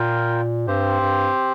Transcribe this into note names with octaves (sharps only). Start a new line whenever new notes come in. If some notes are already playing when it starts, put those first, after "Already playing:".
Already playing: A#2 F4 A#4 G5
G2 C4 G4 C5
G2